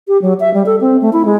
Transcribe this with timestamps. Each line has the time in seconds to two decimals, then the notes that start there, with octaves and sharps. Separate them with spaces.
0.08 G4
0.22 F#3
0.40 E5
0.54 G3
0.66 A4
0.81 C4
1.02 A3
1.13 E4
1.25 G#3